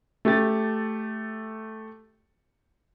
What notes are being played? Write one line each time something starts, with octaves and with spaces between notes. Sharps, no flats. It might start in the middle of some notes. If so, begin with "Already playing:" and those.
A3 G4 A6